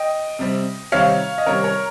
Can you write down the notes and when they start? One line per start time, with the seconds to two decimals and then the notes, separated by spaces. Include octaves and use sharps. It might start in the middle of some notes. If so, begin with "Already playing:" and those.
Already playing: D#5 G5
0.39 C3 G3 C4
0.92 C3 D#3 G3 C4 C#5 F5
1.38 D#5
1.46 C3 D#3 G3 C4 A#4 C#5
1.64 A#4 C#5